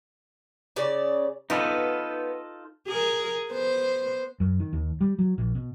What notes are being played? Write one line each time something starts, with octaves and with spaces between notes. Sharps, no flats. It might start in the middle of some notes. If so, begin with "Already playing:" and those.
C#3 D5
B3 D#4 F4 A4
G#4 A#4
B3 C5
F#2
D#3
D#2
G3
F#3
A#1
B2